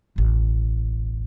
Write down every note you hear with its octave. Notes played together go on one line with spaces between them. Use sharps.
E1 A1